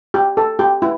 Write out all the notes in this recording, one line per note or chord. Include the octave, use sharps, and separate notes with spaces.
G4
A4
G4
E4